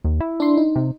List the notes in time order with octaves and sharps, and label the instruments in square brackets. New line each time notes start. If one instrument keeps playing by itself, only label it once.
[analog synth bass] D#2
E4
[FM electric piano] D4 C6
D#4
[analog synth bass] C3